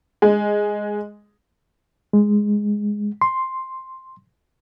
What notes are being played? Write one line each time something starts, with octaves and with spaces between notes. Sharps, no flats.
G#3
G#3
C6